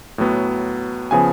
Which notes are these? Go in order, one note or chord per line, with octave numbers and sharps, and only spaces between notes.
A2 F#3 B3
C#3 F3 B3 G#5